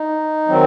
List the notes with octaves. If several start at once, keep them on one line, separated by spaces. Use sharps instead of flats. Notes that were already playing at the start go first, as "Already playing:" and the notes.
Already playing: D#4
D#3 F#3 C4